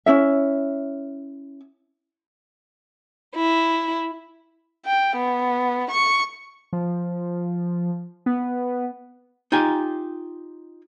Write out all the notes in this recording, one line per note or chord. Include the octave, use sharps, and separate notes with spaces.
C#4 E4 E5
E4
G5
B3
C#6
F3
B3
D#4 F4 G4 G5 G#5